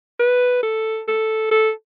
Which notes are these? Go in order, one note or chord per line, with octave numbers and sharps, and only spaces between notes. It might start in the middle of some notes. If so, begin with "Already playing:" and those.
B4
A4
A4
A4